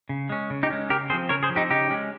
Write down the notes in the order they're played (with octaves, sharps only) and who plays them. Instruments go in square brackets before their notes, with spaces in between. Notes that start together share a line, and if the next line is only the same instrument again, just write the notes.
[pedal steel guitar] C#3
G#3 C#4
C#3
D#4 G4
G#3 C#4
C#3 G4 A#4
C4 G#4 C5
F3
C#3 A#4 C#5
G#4 C5
F3
C4 D#4 G4
C#3 D#4 G4
G#3 C#4